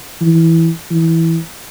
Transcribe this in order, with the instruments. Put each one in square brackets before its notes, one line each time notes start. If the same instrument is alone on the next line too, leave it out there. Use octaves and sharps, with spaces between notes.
[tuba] E3
E3